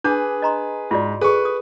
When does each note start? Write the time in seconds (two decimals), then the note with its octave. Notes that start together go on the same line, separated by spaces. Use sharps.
0.04 D4 G#4 B4 A5 D6
0.42 D#5 A#5 C6
0.91 G#2 F4 F#4 D5
1.21 G#4 A4 B4 G#5 C#6
1.45 D#6